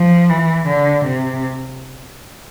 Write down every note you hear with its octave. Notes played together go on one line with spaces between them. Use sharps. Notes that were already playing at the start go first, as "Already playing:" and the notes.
Already playing: F3
E3
D3
C3